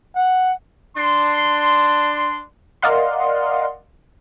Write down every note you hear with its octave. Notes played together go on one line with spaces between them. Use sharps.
F#5
D4 C6
A#4 D5 D#5 F5 F#5 C6